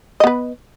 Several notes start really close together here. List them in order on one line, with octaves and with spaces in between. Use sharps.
D#5 B3 B4